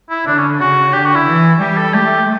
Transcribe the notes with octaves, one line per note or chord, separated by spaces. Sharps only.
E4
D3 D4
C#4
C#3 F#4
D3 G4
F#4
E4
E3
G3 G4
A4
A3 G4